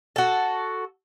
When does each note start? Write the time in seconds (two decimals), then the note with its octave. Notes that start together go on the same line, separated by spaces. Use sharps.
0.16 F#4 A4